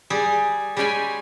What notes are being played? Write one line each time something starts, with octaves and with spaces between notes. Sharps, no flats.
G3 G#4
G3 G#3 C#4 G5 G#5 B5